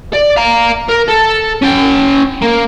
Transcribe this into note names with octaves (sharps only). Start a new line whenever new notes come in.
D5
F5 A#5
A#4
A4
C#4 G5
A#3